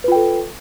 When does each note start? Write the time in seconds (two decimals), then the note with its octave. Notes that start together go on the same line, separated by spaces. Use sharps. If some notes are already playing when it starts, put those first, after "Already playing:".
0.04 B4
0.08 F4
0.12 G5
0.16 A4